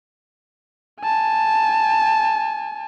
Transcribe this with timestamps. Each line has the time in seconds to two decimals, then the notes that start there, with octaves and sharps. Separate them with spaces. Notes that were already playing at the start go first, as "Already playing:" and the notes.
1.02 G#5 A5